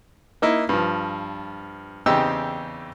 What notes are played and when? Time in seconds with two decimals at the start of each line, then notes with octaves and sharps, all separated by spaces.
0.42 A#3 D#4 E4
0.69 G2 F3
2.06 E2 C#3 C4 D#4 G4 E6